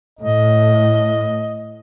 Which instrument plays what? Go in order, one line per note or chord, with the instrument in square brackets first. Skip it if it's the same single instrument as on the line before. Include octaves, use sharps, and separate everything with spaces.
[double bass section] A2 [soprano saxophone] D#5